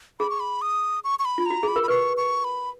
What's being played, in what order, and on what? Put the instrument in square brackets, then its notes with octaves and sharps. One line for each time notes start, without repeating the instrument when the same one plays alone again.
[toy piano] G#4 [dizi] B5
[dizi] C#6
B5
D#6
C#6
C#6
B5
[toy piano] F4
[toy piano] F#4 [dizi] A#5
[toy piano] G#4 [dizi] B5
[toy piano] A#4
[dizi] B5
[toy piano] B4 [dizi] C#6
[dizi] C#6
B5